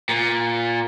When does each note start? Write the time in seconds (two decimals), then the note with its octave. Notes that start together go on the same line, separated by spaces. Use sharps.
0.09 A#2